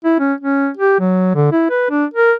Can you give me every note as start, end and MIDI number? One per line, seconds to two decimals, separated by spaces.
0.05 0.15 64
0.20 0.34 61
0.41 0.69 61
0.77 0.97 67
1.00 1.33 54
1.35 1.49 50
1.52 1.67 64
1.70 1.87 71
1.90 2.05 62
2.14 2.33 70